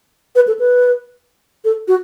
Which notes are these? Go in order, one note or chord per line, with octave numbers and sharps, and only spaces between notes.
B4
A4
B4
A4
F#4